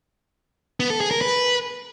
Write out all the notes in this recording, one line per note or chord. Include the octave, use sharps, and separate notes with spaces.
B3
A4
G#4
A#4
B4